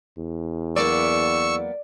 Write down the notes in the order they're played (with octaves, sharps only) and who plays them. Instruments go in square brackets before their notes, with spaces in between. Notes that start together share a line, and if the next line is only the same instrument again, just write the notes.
[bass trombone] E2
[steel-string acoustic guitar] F#3 A#3 B3 [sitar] D5 [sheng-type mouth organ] C#6 E6